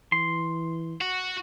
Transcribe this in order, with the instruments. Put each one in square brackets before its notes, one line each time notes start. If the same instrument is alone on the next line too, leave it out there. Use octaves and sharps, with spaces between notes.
[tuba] E3 [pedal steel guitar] C6
[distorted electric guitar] F#4